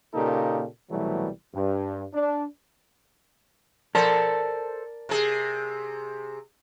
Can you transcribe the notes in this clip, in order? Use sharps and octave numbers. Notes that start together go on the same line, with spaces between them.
A#2 C#3 A#3 D#4 G4 A4
C2 B2 E3 F#3 G3 A3
G2
D4
A4 A#4 C5 D5 A5
C3 G#4